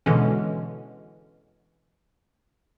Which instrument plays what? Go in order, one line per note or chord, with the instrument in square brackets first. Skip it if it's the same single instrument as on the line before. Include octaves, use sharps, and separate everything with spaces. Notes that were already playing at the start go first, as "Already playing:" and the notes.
[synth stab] B2 D3 E3 G#3 C#4